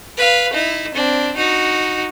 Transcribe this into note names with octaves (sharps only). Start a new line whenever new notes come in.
B4 F5
D#4 E4
C4 D4
D#4 F#4